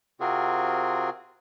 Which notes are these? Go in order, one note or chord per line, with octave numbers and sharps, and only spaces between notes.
C3 C4 F4 F#4 G#4 A#4